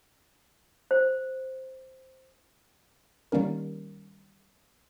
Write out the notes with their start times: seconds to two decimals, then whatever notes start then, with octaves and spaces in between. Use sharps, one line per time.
0.91 C5
3.32 D#3 G3 A#3 C#4 A#4